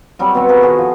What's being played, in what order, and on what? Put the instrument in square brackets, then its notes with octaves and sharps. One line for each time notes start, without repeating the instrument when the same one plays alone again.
[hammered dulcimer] F#3 G3 C4
B2 C4 F#4 C#5
G#4 A#4 B4 F5
D#3 F#4 G#4 A4
F3